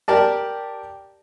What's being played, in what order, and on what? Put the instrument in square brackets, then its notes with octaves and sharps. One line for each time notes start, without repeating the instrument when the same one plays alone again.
[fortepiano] G4 A#4 D5 A5